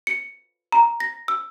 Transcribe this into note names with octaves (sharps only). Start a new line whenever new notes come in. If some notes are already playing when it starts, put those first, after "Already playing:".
C#7
A#5
A#6
E6